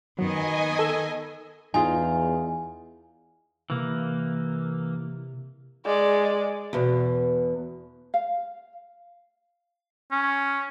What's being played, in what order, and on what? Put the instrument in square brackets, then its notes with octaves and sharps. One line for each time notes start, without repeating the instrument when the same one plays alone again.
[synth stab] F#2 F#3 [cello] D#3 B3 [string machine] D#5 G#5
[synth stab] A4 E6
[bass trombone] E2 [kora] D#4 F4 G#4 [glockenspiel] G#5
[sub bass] C3 [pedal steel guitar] E3 A#3
[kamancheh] G#3 D5
[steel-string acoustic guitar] E2 B2
[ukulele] F5
[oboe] C#4